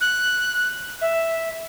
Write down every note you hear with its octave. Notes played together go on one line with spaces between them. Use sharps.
F#6
E5